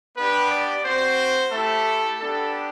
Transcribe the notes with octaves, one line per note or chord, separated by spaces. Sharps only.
B3 D4 G4 B4
D5
C4 F#4 C5
A3 E4 G4 A4
B3 D4 G4 A4